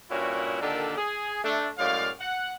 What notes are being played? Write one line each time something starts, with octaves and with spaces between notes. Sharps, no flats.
G2 A#2 C#4 E4 F#4
A#2 D3 D#3 D4 G4 A4
G#4
A3 D4
F#2 A2 G#3 D5 F5
F#5